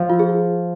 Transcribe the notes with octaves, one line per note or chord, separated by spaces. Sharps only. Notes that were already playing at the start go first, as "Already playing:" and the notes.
Already playing: F3 C5
F4
G#4
F4